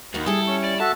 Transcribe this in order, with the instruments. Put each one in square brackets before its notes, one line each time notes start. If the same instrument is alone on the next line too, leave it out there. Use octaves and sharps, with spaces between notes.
[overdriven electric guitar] D#2 [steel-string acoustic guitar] D#3 F#4
[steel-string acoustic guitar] G3 E4 [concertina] G#4 [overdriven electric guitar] A4
[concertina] C#4 C#6
[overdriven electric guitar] D5
[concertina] F#4 A4 E5 [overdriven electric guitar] A5